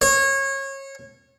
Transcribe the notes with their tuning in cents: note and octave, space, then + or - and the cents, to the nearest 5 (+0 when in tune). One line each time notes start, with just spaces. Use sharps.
C#5 -25